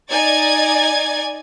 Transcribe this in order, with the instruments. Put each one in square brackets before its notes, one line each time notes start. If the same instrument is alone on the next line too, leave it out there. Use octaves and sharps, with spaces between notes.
[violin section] D#4 D5 G#5 G#6 A6